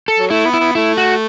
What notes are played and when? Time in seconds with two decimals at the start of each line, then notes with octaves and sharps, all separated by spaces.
0.08 A4
0.19 F#3
0.30 A3 E4
0.45 B3
0.54 E4
0.60 B3
0.75 A3 E4
0.98 F#4